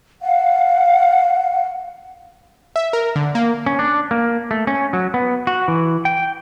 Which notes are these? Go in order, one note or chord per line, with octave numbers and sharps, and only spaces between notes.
F5 F#5
E5
A#4
D3
A#3
C#4
D4
A#3
A3
C#4
F#3
B3
F#4
E3
G5